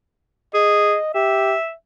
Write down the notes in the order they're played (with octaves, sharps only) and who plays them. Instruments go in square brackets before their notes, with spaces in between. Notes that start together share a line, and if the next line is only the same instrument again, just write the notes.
[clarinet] G#4 [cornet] D#5
[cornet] G4 [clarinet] E5